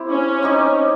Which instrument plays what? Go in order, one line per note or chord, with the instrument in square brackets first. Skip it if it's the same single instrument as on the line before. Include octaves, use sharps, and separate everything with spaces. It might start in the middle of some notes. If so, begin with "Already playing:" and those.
Already playing: [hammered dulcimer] C4 E4 G4
[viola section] C#4
[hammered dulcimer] C4 D#4 G4